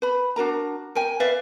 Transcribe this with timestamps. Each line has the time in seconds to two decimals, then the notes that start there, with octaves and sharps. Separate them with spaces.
0.02 B4 B5
0.36 D4 F#4 A#4 A#5
0.95 A#4 G5 G#5
1.20 B4 D5 E5 F5